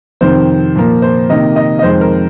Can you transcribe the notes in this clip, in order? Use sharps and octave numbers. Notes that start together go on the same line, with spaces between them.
F2 C3 D#3 C5
A#2 F3 A#3
C5
C3 D#3 A#3 D#5
D#5
D#5
F2 D#3 G#3 C5
A#4